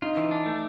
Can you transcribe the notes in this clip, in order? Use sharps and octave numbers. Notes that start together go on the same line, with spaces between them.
D#4 F4
E3
D4
A3